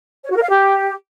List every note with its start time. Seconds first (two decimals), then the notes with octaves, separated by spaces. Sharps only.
0.24 C#5
0.31 F#4
0.37 A#4
0.43 F5
0.49 G4